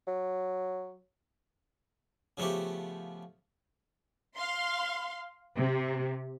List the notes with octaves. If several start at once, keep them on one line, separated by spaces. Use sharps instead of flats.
F#3
C#3 F3 A3 B3 G4
F5 C6
C3